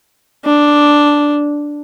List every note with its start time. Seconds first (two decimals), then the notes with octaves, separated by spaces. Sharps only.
0.45 D4